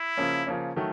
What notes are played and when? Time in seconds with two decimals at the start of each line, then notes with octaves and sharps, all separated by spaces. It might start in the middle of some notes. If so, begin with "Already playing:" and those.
Already playing: E4
0.17 C#3 F3 A#3 C#4
0.47 C#3 F3 A#3 C#4
0.76 D#3 F#3 A3